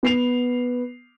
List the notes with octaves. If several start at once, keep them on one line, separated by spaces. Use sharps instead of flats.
B3 C7 F7